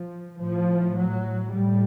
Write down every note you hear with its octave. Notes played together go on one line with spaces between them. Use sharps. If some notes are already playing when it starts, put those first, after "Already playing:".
Already playing: F3
A2 F3
F#3
A2 G3